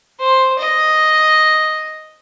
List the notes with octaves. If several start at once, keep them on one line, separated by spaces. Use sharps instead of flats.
C5
D#5